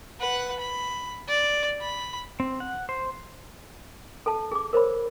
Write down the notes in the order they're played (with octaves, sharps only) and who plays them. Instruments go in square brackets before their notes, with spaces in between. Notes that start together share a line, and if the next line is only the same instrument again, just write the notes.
[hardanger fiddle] B4 F#5
B5
D5
B5
[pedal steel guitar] C4
F#5
C5
[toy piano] A4 A5
G#4 D6
A#4 C5 C#5 B5